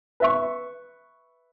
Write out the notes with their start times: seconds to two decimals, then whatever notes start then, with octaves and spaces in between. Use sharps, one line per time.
0.20 B4 E5 C#6